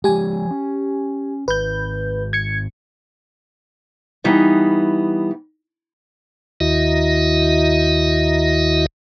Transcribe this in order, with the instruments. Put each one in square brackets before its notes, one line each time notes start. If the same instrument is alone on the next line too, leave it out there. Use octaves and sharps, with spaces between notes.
[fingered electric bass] F3 G#3 [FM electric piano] G4 G#5
[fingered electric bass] C#4
[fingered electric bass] G#1 [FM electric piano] B4 G6
[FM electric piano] G#6 C#7
[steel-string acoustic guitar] E3 G3 B3 D#4
[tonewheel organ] D#2 D#3 E4 F#4 D#5 E5